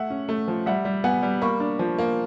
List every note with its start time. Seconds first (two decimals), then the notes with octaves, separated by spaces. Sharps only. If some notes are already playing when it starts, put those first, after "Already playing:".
Already playing: A3 E5 F#5
0.10 C#4
0.29 A3
0.48 F3
0.66 G3 E5 F#5
0.85 G3
1.04 B3 F#5 G#5
1.23 G3
1.42 A#3 B5 C#6
1.60 D4
1.79 F3
1.98 A#3